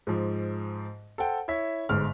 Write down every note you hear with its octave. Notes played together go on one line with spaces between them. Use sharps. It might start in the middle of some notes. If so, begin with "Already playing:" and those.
G#2 F3
A4 C5 F#5 G5
E4 C#5 E5 B6
G1 G#2 F6